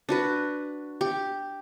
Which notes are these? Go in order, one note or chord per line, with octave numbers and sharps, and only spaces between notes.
D4 F#4 B4
G4